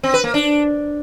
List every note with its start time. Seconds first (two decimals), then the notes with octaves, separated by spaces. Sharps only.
0.03 C4
0.14 B4
0.24 A#3
0.34 D4